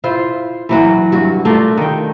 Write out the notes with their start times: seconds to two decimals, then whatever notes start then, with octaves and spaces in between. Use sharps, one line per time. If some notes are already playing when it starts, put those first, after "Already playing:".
0.04 E4 F4 C5
0.69 E3 F#3 F#4
1.12 G2 F#4
1.45 A3 D4 F4 A#4
1.77 D#3 G5